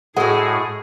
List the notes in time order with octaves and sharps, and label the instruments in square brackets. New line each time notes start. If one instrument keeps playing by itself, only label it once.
[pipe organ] A2 [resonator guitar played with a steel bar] G#3 F#4 [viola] G#4 [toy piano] A4 F#5